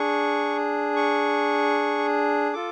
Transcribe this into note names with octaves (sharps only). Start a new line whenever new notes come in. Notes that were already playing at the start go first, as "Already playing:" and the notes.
Already playing: D4 G#4 C#6
C#6
F4 A4 D6